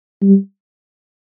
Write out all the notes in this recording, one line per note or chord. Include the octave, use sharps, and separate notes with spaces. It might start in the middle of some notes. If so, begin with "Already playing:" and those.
G3